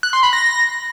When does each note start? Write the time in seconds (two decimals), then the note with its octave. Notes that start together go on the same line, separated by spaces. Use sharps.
0.03 F#6
0.13 C6
0.23 B5
0.33 A#6